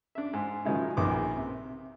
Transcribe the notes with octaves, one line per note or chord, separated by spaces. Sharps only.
D4 E5
G#2
D#3 F3 F#3 G#3 D#4 E4
A#1 D#3 B3 D6
C3